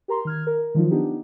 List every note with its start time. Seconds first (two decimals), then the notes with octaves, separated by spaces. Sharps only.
0.08 G4 A#4 A#5 C6
0.25 D#3 F6 G#6
0.47 A#4
0.75 D#3 F3 F#3 D#4 F4
0.91 B3 D4 D#4 G4